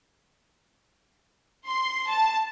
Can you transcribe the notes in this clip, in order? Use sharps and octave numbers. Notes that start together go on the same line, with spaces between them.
C6
A5